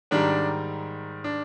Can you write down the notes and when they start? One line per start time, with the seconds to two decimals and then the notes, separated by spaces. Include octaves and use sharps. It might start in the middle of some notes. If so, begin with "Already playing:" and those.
0.11 G#2 D#3 G3 D4
1.24 D4